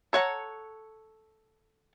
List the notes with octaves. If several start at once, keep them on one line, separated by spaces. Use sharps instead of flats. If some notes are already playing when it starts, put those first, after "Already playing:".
A4 C#5 F#5 A#5